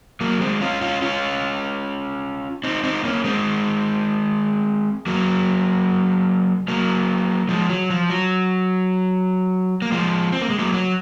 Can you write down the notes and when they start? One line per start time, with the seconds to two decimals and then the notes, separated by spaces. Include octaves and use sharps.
0.21 F#3 A#3
0.41 G#3 C4
0.61 C#4 F4
0.81 C#4 F4
1.02 C#4 F4
2.64 C4 D#4
2.84 C4 D#4
3.04 A#3 C#4
3.24 G#3 C4
5.07 F#3 A#3
6.68 F#3 A#3
7.49 F3 G#3
7.70 F#3
7.90 F3
8.10 F#3
9.82 A#3
9.92 F3 G#3
10.32 C4
10.41 A#3
10.50 G#3
10.59 F#3 A#3
10.73 F#3